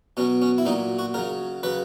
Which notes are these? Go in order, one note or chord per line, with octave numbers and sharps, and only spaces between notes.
B2 F#3 C#4
C#4
E4
A#2 F#3 D#4
F#4
C#3 F#3 A#4
C#3 F#3 B4